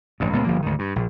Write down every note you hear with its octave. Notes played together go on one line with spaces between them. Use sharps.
A1 G2
C#2 A#2 B3
G1 F3 A#3
D2 G#2 D#3
G2
A#1